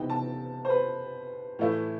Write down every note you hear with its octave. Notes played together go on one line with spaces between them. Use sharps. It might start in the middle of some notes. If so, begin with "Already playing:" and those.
Already playing: C3 E3 B3 D#4 G5
A5
C5
B4
A2 E3 A3 E4